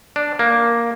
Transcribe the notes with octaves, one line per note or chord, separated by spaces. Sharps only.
D4
A#3